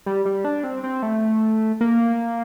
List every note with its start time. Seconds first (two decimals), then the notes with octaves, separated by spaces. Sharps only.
0.06 G3
0.25 G3
0.45 D4
0.64 C4
0.84 C4
1.03 A3
1.81 A#3